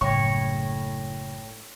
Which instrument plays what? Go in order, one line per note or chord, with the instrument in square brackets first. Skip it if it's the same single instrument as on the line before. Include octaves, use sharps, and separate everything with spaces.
[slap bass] F#1 [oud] A2 [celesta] C#5 G5 A#6 [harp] C#6